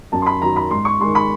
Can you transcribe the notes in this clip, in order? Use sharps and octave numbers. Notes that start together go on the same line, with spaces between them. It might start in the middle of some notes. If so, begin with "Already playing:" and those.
F#2 A5
C6
B5
D#3 F#3 A#5
B5
G#2 C6
C#6
D#3 G#3 C6
B5